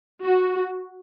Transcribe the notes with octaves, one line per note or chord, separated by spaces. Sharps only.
F#4